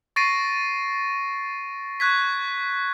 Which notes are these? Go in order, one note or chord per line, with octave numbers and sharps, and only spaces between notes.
C#6 A6 A#6 C7 D7 D#7
C#6 F#6 G#6 B6